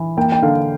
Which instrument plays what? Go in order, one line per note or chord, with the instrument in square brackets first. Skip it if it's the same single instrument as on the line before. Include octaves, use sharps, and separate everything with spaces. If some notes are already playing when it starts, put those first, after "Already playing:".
Already playing: [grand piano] E3
A#3 G5
G5
D3 F5